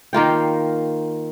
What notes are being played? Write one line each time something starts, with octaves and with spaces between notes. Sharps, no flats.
D#3 A#3 F4 G5